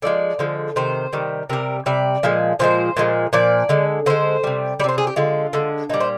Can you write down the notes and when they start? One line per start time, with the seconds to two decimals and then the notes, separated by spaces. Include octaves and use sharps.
0.02 D3 F3 G#3 D5
0.39 D3 F3 G#3
0.76 C3 D#3 C5
1.13 C3 D#3 G3
1.49 C3 G3 A#4
1.86 C3 G3 D5
2.23 A#2 F3 G#3
2.59 A#2 F3 G#3 C5
2.97 A#2 F3 G#3
3.33 A#2 F3 D5
3.69 D3 G#3
4.06 D3 G#3 C5
4.44 C3 G3
4.80 G3 D5
4.84 C3 C5
4.98 G#4
5.07 G4
5.16 D3 G#3 F4
5.53 D3 G#3
5.89 A#2 G3 D#4
6.00 C5